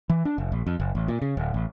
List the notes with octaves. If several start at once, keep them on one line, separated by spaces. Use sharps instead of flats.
E3
D4
F1
A#1
F2
F#1
A1
A#2
C#3
D1
A1